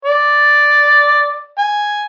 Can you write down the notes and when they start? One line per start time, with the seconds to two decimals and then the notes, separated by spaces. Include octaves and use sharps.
0.05 D5
1.58 G#5